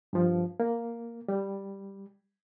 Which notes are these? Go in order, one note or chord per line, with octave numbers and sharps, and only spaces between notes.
G2 F3
A#3
G3